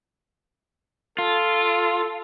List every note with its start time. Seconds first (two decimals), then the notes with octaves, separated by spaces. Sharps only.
1.18 F4 A4